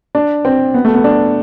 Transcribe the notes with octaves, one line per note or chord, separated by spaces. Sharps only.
D4
C4
B3
A3
B3
D4